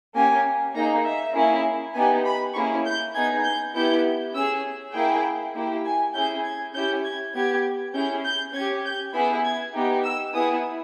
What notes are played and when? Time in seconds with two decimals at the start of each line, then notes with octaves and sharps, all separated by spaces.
0.15 A#3 C#4 G4 G#5
0.75 A#3 D#4 G#4 A#5
1.05 E5
1.35 A#3 C#4 E4 G#4
1.95 B3 D#4 G4 G#5
2.25 B5
2.55 A#3 C#4 E4 G#4 C#6
2.85 G6
3.15 B3 D#4 G#4 G#6
3.44 G6
3.75 B3 E4 G4 G6
4.35 C#4 G#4 E6
4.94 A#3 E4 G#4 G5
5.54 A#3 E4 G4
5.84 G#5
6.15 C#4 E4 G#4 G6
6.44 G#6
6.74 C#4 E4 G4 G6
7.04 G#6
7.34 B3 G4 G#6
7.95 C#4 E4 G#4 G6
8.25 G6
8.54 C#4 G#6
8.58 G4
8.84 G6
9.14 B3 E4 G#4 B5
9.44 G#6
9.74 B3 D#4 G4
10.04 E6
10.34 B3 E4 G#4 D#6